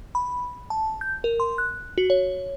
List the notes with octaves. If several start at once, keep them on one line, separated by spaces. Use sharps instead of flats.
B5
A5
G6
A#4
C6
F#6
F#4
C#5